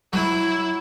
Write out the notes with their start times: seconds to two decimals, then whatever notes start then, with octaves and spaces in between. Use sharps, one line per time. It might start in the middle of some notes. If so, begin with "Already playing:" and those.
0.13 F#3 E4